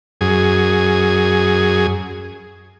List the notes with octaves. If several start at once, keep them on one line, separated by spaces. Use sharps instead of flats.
F#2 G#4